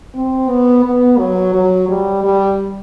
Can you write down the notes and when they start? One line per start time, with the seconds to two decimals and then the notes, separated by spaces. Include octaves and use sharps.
0.15 C4
0.49 B3
0.84 B3
1.18 F#3
1.54 F#3
1.89 G3
2.24 G3